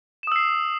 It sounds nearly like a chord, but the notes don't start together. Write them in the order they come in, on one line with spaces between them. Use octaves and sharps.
E7 D#6 E6 C7